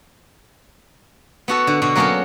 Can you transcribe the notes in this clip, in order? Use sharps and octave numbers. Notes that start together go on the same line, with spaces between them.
B3 F#4 A4
D3
B2 D3 F#4
F#3 A#3 B3 C#4 A4 A#4